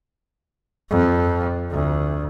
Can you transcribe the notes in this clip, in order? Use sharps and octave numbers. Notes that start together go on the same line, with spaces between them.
F2
D2